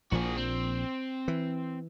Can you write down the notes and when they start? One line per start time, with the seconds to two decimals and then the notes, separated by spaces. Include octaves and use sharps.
0.12 A#1 A#2 F3 F#4 G#4
0.37 C4
1.28 E3